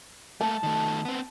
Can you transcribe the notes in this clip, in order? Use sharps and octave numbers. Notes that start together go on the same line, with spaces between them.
A3 A#3 A5
D#3 A3
B3 C4